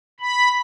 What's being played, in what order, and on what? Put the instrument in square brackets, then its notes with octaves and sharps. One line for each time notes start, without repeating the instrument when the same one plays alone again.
[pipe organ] B5